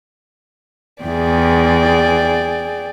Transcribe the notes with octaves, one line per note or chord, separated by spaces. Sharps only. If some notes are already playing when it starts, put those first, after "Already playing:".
E2 G#4 D5 G5